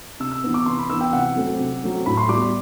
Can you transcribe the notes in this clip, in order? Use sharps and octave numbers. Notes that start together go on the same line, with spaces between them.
C3 E6
E6
E3 B3
D6
C3 C6
B5
E3 B3 E6
G5
C3 F#5
F#3 A3 C4
C3
F#3 A3 C4
A2 B5
C6
G3 B3 D6